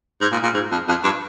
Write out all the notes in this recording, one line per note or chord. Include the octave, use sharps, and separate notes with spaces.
G#2
A#2
A#2
G#2
F2
F2
G2